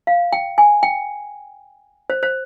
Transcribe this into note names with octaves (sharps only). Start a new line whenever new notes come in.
F5
G5
G#5
G5
C5
C5